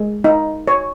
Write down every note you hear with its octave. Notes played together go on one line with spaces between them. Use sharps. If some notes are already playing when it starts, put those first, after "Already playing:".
Already playing: G#3
D#4
C#5